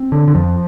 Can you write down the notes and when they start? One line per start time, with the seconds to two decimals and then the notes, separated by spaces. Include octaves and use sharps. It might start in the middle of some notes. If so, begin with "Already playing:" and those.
Already playing: C4
0.12 D3
0.28 D3
0.35 F2 F3